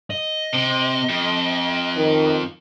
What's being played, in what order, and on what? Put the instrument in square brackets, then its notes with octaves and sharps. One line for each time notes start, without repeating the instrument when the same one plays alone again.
[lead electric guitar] D#5
[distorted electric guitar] C3
F2
[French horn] D#3